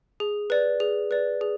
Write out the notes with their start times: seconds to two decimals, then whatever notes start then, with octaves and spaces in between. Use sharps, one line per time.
0.20 G#4
0.50 B4 D5
0.80 G#4
1.11 B4 D5
1.41 G#4